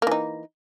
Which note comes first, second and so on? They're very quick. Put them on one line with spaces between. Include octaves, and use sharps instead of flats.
A#3 E3 D#4